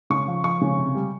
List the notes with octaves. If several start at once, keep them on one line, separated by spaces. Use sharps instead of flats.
C#3 C#6
F3
F3 C#6
C#3
C3
G3